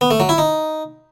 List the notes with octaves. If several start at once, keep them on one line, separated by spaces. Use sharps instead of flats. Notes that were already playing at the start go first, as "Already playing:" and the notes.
B3
A3
F#3
E4
D#4